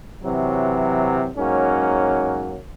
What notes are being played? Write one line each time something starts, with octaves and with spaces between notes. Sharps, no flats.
C3 E3 F#3
G#2 F#3 A#3 C#4